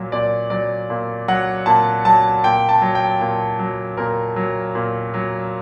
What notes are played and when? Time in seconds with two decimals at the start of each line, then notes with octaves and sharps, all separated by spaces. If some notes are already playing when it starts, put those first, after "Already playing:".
Already playing: A#2 F#3
0.12 A#2 D5
0.50 F#3 D5
0.90 A#2
1.28 F#3 F#5
1.66 A#2 A5
2.05 F#3 A5
2.44 A#2 G5
2.69 A5
2.82 F#3
2.95 G5
3.21 A#2
3.59 F#3
3.97 A#2 A#4
4.36 F#3
4.75 A#2
5.14 F#3